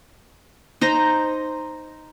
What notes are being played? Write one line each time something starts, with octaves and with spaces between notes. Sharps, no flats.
D#4 C5 A#5